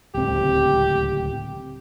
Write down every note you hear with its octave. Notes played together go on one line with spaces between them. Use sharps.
D1 C#2 C4 G4